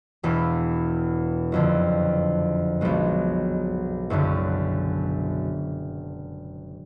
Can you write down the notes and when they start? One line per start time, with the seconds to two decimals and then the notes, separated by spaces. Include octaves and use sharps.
0.23 E1 E2 B2
1.52 F#1 F2 D3
2.81 B1 B2 G#3
4.10 F#1 F#2 D3